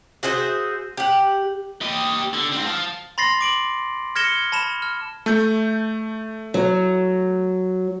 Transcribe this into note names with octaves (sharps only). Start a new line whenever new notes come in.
F#4 G#4 C5 E5
G4 F#5
G4 D#5
D3
G#2 C4
F5 A5
B5 C6 A6 A#6 C7
D6 D7 F#7
F6 G#6 A#6 C#7 E7 G7
A5 B5 E7
F6
A3 G6
F#3